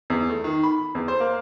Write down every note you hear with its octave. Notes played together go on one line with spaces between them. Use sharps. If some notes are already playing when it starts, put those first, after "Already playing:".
E2
A3
D#3
B5
E2
C5
A#3